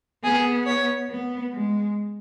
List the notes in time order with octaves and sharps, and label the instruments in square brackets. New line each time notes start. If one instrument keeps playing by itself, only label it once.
[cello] B3 [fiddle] G#4
[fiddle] C#5
[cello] B3
G#3